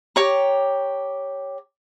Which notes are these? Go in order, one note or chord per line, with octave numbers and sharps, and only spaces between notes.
G4 C#5 A#5